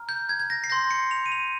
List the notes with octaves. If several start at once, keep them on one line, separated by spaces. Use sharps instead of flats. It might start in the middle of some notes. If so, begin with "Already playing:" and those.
Already playing: A#5 F6
G6
G#6
G#6
A#6
C7
C6 G6 A#6
C#7
F7
D#7
F7